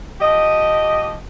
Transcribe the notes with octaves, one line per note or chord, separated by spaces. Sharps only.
F3 G4 D#5